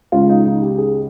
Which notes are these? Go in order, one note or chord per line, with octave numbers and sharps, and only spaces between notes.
C#2 C#3 G#3 F4
D#4
D#4
G4
G#4